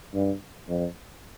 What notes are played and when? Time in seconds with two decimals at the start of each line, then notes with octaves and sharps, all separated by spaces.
0.14 G2
0.68 F2